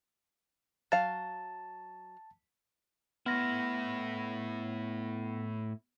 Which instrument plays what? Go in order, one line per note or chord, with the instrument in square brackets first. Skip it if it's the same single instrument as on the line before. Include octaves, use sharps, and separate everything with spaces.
[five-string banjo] F#3 F5 [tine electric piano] A5
[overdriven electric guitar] A2 E4 [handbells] B3 A#6